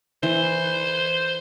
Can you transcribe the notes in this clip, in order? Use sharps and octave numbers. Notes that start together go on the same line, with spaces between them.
E3 C5